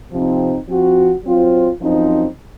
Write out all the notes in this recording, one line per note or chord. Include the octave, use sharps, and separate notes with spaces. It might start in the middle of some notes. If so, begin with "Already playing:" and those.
C3 F3 C4 D#4
F3 C4 F#4
F#3 C4 F4 C5
F#2 F3 C4 D#4